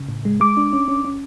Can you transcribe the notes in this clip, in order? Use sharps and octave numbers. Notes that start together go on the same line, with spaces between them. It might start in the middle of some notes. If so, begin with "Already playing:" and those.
Already playing: C#3
A2
G#3
G#3 D6
D4
C#4
C#4
C#4